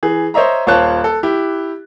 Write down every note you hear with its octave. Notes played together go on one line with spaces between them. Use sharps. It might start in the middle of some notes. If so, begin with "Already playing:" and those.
E3 G#4
C5 C#5 D#5 E5 A#5
D#1 F4 C5 C#5 A5 F#6
A4
E4 G4